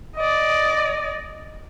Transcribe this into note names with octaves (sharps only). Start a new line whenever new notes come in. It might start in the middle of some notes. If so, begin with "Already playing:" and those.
D5 D#5